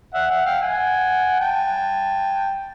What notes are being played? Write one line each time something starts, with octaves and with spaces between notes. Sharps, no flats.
E5 F#5
E5 F#5
F5 G5
F#5 G#5
G5 A5